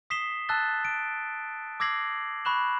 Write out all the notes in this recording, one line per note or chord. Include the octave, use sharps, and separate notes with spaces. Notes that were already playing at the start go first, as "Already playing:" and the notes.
D#6 B6 C7 E7 G7
A5 E6 F#6 A6 G7
D7
D6 E6 G#6 A#6 C7 F#7
B5 C#6 F#6 E7 F#7